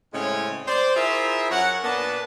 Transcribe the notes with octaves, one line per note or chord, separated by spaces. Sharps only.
A2 C#3 G#3 C4 C#4 C#5
C5 D5
E4 F4 G#4 A#4 C5 E5
F#2 A#4 C#5 F#5
A#2 A#3 B3 D4 B4 A5